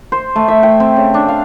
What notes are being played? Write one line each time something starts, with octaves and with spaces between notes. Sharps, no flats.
C5
A3
E5
G5
C4
C#3
D4
F5